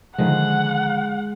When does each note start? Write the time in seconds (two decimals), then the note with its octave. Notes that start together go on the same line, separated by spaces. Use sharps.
0.18 D3 D#3 F3 G#3 F#5